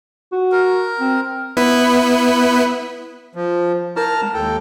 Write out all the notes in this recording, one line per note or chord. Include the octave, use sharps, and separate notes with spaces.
F#4
A#4
C4
B3 E4 B4
F3
E4 A#4 A5 A#5 F6
G#3
D#2 A4 G5